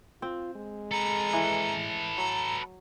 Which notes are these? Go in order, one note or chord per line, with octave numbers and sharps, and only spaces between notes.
C4 F4
G#3
A4 B4 A#5
E3
F#3 A#5